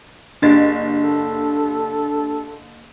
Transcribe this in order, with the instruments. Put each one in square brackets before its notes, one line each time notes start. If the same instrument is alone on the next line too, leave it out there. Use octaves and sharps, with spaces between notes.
[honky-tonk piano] F#1 A6 [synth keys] D4 G4
[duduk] A4